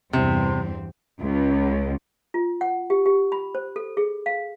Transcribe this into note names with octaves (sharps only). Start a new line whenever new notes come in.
E2 G2 C3 C4
C#2
F4
F#5
G4
G4
B5
C5
A4
G#4
F5